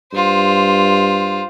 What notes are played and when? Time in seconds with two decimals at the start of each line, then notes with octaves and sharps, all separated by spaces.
0.13 G2 F4 C5